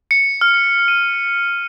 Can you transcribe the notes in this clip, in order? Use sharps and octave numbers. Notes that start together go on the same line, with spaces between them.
C#7
F6
D#7